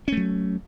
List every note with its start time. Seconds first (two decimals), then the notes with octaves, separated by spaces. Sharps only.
0.08 C#4
0.12 A3
0.17 F#3